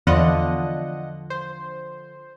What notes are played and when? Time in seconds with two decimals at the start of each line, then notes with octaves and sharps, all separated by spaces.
0.07 E2 D3 F3 D4 F4 D#5 F#5
1.30 C5